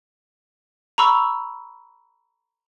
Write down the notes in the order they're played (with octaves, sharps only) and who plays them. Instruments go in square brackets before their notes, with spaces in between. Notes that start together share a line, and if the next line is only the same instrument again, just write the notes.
[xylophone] A#5 B5 C#6 E6